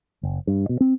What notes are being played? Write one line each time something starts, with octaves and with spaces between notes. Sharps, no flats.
F#1
G2
B2
C4